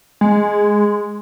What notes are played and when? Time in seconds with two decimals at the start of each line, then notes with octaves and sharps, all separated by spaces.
0.21 G#3